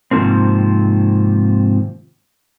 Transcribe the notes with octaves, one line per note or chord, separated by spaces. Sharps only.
G#2 C3 D#3 F3 A#3 C4